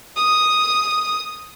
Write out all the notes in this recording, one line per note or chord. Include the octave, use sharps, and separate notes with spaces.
D#6